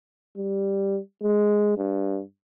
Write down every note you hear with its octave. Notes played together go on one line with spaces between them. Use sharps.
G3
G#3
G2